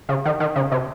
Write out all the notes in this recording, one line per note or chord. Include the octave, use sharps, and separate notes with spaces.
C#3
D#3
D#3
C#3
C3